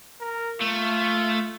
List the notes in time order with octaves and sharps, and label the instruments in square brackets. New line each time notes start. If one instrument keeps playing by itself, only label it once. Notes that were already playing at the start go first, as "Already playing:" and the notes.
[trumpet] A#4
[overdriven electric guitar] A3 [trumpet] F4